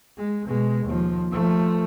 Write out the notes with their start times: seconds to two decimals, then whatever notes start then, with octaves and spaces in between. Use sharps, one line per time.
0.18 G#3
0.47 B2 G#3
0.85 D#2 F3
1.31 F3 A3